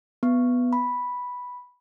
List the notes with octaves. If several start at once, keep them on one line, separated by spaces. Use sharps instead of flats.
B3
B5